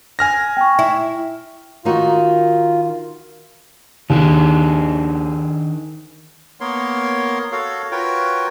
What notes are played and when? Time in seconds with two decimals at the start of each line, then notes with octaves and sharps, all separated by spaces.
0.19 G#5 F6 A#6
0.57 G5 C#6
0.79 E4
1.85 D#3 D#4 F4 F#4
4.10 D#2 D#3 D4 G#4
6.60 A#3 B3 A#4 C#5 C6
7.52 F#4 A4 C#5 F5
7.91 F4 F#4 A#4 B4 C#5 G5